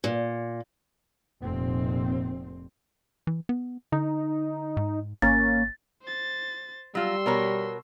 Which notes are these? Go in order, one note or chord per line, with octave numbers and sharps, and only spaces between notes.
A#2
F1 A#2 C4
E3
B3
D3 D#4
G#2
G#1 A#3 C#4 A6
C5 A6
F#3 G3 F4 C6 E6
B2 A#4 C#5